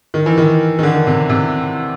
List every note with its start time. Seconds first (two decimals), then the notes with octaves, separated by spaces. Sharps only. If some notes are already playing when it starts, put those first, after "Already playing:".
0.14 D#3
0.26 E3
0.38 D#3
0.79 D#3
0.83 D3
1.07 C3
1.30 C3